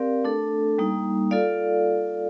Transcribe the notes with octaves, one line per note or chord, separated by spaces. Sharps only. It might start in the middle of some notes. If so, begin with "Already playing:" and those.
Already playing: C4 G4 A#4 D5 F5
A3 D4 A4
G3 A#3 D#4
F4 A4 D5 F5